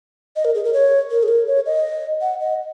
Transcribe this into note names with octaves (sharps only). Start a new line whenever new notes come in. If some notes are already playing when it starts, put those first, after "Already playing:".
D#5
A#4
G#4
A#4
C#5
A#4
G#4
A#4
C#5
D#5
F#5
D#5